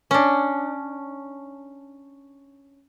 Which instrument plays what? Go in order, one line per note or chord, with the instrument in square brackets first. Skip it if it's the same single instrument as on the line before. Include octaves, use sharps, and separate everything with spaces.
[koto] C#4 D4